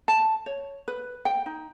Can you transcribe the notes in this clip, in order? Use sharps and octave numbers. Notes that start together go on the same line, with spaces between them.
A5
C#5
B4
G5
D#4